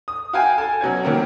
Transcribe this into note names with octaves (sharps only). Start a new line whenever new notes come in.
D#6
F#4 F5 G5 G#5
A4 G#5
B2 F#3 C#4 G#6
D#3 F#3 G3 A#3 C4 C#4